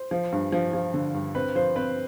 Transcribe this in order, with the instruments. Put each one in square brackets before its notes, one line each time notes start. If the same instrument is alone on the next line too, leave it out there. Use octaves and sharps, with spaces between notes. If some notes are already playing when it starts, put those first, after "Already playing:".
Already playing: [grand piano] C5
[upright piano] F3
G2
F3
F3
D3
G2
[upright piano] C4 [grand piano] B4
[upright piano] F3 [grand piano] C5
[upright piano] C4 [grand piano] B4